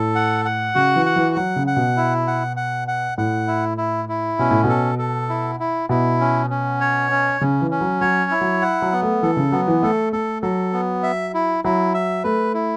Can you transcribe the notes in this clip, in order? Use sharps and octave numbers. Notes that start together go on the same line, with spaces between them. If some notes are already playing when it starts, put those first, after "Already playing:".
Already playing: A2 A4
F#5
F#5
C#3 F#4
E3
F#5
E3
F#3 F#5
C#3
F#5
B2
E4
F#5
F#5
F#5
A2 F#5
E4
E4
E4
B2 C#4
A2
B2
A4
A4
E4
E4
B2 E4
C#4
C#4
C#5
C#4
C#3 C#4
E3
C#4
F#3
F#3 C#5
E4
F#3
F#5
F#3
B3
A3
E3 A4
C#3
F#3 B3
E3
A3 A4
A3 A4
F#3 A4
B3
E5
E4
F#3 E4
E5
A3 B4
E4